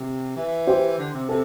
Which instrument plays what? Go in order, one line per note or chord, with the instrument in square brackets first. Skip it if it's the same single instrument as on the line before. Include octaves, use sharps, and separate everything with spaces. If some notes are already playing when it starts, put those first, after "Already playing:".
Already playing: [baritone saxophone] C3
E3
[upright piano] G4 C5
[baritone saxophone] D3
C3
[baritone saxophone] C3 [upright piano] A4